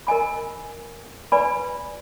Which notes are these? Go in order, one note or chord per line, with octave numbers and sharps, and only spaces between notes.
A#4 D#5 G#5 B5
B4 D5 G#5 B5